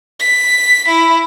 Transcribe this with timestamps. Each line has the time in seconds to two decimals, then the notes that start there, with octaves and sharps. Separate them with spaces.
0.20 B6
0.88 E4